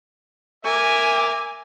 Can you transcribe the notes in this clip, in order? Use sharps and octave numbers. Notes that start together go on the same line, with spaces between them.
A#4 E5 G#5 D6